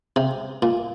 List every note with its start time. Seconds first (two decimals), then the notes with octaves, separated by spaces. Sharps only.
0.16 C3
0.62 A#2